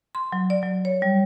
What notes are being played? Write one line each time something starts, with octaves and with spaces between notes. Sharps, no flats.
C6
F#3
D5
F#3
C#5
G3